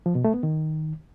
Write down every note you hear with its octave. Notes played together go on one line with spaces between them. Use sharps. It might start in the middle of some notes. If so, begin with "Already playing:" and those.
F3
B2
A3
B3
D#3